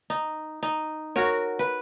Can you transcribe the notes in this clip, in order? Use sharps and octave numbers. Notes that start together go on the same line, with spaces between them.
D#4
D#4
F#4 A#4 C#5
B4